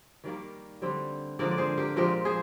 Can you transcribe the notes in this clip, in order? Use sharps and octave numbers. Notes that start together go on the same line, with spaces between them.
D#3 G3 A#3 A#4 D5
D3 G3 C4
D3 F3 G#3 A#4 D5
D5
G#4 C5
G4 A#4
A#2 F3 G#3 C4 G4 A#4
G#4 C5